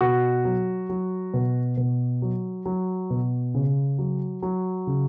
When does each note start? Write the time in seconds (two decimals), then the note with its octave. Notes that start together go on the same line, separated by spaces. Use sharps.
0.01 B2 F#4
0.45 F#3
0.89 F#3
1.34 B2
1.77 B2
2.22 F#3
2.66 F#3
3.10 B2
3.54 C#3
3.98 F#3
4.42 F#3
4.87 C#3